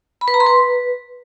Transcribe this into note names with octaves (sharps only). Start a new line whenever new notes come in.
B5
B4
A#5
C6
B4